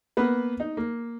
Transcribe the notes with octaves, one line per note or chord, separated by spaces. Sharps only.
A#3 B3 B4
D#4
A#3